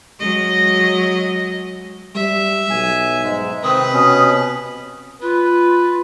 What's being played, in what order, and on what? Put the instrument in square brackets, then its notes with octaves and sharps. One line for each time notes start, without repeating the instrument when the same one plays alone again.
[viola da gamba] F#3 G#3 D#5
[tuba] G3 [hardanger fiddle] E5
[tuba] B1 [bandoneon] G#5
[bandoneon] G#2 G#3
[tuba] C3 [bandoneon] D#3 C4 [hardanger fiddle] B4 [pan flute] D#6
[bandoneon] B2 C#4
[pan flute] F4 [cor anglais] B4